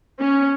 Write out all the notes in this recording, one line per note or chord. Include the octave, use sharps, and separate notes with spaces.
C#4